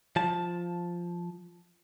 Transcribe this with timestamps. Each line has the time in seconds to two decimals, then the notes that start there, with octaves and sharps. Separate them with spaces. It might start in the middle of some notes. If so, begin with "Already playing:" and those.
0.16 F3 A5